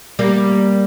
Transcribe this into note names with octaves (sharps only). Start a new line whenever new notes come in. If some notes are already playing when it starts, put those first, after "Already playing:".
G3 A#3